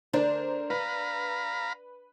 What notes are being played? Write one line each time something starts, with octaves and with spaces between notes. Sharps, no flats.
D3 D4 A#4 C5
B4 F5 A#5 B5